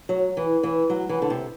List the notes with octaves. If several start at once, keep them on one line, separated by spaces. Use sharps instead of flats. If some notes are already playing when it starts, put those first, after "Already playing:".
F#3
E3
E3
F#3
E3
D3
C3